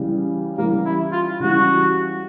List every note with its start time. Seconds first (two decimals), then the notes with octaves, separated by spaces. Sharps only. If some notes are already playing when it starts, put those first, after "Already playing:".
Already playing: C#3 E3 G3
0.58 C#3 E3 G3 A#3
0.86 E4
1.12 F4
1.40 C#3 E3 G3 F#4